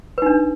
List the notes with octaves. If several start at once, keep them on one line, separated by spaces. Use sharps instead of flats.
D4 D#4 B4